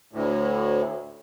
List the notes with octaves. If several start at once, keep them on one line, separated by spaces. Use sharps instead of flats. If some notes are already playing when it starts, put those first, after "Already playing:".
D2 A2